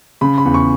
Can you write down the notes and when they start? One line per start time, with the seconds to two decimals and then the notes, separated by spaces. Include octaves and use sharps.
0.21 C#3 B5
0.38 B5
0.45 E2
0.54 C#6